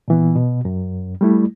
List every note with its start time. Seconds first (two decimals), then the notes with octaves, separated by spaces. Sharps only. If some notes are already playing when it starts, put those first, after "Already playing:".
0.08 A#2 E3 B3
0.36 B2
0.65 F#2
1.21 G3 A3 E4